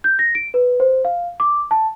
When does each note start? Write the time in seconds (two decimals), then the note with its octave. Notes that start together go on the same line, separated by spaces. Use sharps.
0.04 G6
0.19 A#6
0.35 D7
0.54 B4
0.80 C5
1.05 F5
1.40 D6
1.71 A5